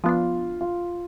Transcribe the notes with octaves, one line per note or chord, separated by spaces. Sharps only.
F3 B3 D4 F4
F4